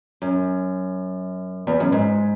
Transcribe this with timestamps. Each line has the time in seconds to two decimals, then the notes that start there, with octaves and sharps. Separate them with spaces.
0.22 F#2
1.67 E2
1.80 F#2
1.92 G#2